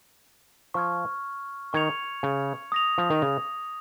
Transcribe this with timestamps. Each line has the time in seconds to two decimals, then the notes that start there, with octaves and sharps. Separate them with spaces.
0.74 F3 C#6 F6 G#6
1.73 D#3 C#6 G#6 C#7 F7
2.23 C#3
2.72 D#6 A#6 F7
2.98 F3
3.10 D#3
3.22 C#3